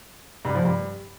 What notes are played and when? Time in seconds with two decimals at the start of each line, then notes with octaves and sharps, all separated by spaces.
0.45 G2
0.55 F3
0.65 G2